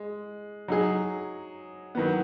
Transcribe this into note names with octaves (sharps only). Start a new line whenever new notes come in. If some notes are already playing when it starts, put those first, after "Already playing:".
Already playing: G#3
F#3 D#4 G#4
D#3 F#3 B3